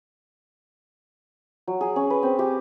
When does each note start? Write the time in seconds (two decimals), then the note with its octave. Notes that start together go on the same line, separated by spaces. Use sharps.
1.68 F#3
1.81 G#4
1.96 C#4
2.10 B4
2.23 C4
2.39 G4